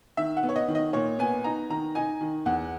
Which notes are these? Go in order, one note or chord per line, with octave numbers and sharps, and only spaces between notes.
D#3 E5
F#5
B3
C#5
D#5
D#3
D#5
A#2 C#5
B3 G#5
D#4 A#5
D#3 A#5
D#4 G#5
D#3
E2 F#5